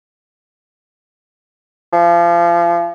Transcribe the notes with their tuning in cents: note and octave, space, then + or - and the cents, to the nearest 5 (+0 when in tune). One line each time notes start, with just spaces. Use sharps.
F3 -30